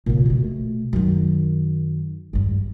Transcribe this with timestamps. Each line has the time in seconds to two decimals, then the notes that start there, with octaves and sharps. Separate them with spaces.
0.06 A#2 C#3
0.26 B2 A3
0.93 F#2 D#3
2.33 E2 G2